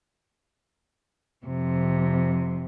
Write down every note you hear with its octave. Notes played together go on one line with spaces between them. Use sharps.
F2 C3